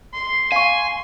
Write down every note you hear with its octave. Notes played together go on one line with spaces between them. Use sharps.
C6
F5 G#5 C#6